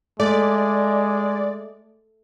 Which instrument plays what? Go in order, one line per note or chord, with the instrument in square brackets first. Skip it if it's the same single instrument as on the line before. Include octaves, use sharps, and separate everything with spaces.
[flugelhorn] G#3 [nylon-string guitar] A3 [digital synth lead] D5